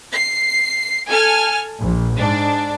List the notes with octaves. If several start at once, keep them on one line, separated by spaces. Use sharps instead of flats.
C7
A4 G#5 F6
A#1
G#2 D4